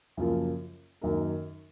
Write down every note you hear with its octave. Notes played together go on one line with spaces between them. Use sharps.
F#2 C#3 F3 A#3 F4
F#2 D#3 A#3 D#4 A#4